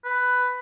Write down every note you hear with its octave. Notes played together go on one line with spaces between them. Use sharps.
B4